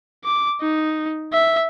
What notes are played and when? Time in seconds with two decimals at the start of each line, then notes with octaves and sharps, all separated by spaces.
0.25 D6
0.61 D#4
1.33 E5